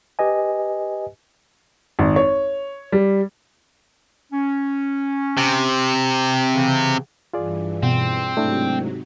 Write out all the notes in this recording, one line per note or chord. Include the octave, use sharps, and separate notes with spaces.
G4 B4 D#5 G#5
G#1
C#5
G3
C#4
C3
C#3 E3
G2 E3 F4 G#4 D5
B2 C4
G#2 C3 F#3 A3 D4 E4